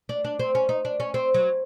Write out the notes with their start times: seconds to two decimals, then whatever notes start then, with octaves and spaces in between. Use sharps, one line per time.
0.09 D4
0.24 D4
0.39 C4
0.55 C#4
0.69 D#4
0.85 D4
1.00 C#4
1.14 C4
1.34 F#3